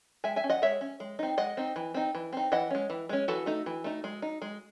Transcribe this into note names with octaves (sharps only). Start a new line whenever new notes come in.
G#3 E5 G#5
E5 G#5
C#4
D#5 F#5
G#3 C#5 E5
C#4
G#3
C4 D#4
G#3 D#5 F#5
C4 D#4
E3
C4 D#4
E3
C4 D#4
E3 D#5 F#5
G#3 C#4
E3
G#3 C#4
E3 F#4 A4
A3 D#4
E3
A3 D#4
G#3
D#4
G#3